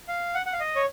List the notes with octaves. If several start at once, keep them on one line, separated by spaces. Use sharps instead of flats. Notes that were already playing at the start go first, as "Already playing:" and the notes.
F5
F#5
F#5
F5
D#5
C#5